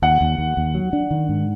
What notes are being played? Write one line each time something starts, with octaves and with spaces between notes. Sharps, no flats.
D#2 F#5
D#2
D#2
D#2
F#3
D4
D#3
G#2